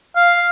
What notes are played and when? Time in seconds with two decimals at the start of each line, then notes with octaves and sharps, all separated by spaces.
0.16 F5